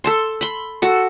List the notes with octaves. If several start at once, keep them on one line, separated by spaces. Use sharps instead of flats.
A4 A5 C6
B5 C6
F#4 A4